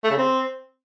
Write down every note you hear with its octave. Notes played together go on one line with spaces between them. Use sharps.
A3
C#3
C4